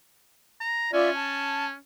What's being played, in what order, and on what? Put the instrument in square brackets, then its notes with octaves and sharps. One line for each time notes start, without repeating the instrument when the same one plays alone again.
[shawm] A#5
[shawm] C#4 [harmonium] F4 D5 E5
[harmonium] A5